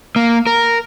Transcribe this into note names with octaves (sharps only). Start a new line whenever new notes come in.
A#3
A#4